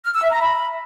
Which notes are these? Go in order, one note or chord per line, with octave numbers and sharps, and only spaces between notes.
F6
E6
E5
A#5
B5